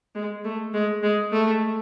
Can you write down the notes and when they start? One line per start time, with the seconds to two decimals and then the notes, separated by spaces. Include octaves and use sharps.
0.15 G#3
0.44 A3
0.74 G#3
1.03 G#3
1.32 A3